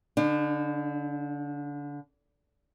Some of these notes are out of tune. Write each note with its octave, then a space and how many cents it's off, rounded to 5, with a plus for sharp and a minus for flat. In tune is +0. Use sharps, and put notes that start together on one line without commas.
D3 -25 D4 +40